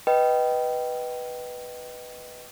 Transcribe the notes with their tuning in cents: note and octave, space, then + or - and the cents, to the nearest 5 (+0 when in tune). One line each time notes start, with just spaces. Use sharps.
B4 +0 D#5 +0 G5 -20